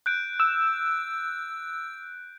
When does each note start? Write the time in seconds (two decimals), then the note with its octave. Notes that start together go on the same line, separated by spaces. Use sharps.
0.06 F#6 G6 D7
0.40 E6